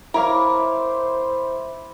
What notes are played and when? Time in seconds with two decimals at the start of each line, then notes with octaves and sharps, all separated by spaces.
0.14 E4 A#4 C5 C#5 F5 D6